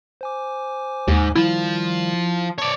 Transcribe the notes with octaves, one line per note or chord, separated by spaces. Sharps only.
C5 G#5 D6
D#2 G#2
D#3 F3 G3 E4 F4
C#5 D5 A5